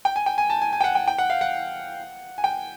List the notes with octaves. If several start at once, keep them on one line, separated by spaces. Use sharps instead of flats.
G5
G#5
G5
G#5
A5
G#5
G#5
G5
F#5
G5
G5
F#5
F5
F#5
G#5
G5